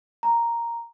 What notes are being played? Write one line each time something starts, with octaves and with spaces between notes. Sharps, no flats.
A#5